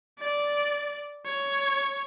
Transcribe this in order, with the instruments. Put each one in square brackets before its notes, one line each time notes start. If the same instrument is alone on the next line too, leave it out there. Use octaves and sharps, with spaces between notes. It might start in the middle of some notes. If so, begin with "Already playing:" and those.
[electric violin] D5
C#5